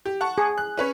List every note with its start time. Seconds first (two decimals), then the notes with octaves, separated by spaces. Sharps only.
0.05 G4
0.21 F#5 A5 C#6
0.38 G#4
0.58 F#6
0.77 C#4 B4 C#5